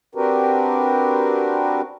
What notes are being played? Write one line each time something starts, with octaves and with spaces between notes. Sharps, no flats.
C4 D4 F#4 G4 A#4 B4